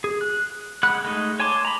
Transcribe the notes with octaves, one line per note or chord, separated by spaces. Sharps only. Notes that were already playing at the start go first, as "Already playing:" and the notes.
G#4
F#6
G#3 F#5 B5 F#6
G#3 A3 D#4
C#5 G#5 A5 C6 D6
A#5 B5